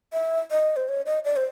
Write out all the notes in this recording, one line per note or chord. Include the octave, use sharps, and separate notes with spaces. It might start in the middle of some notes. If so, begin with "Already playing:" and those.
E5
D#5
C5
C#5
D#5
D5
C5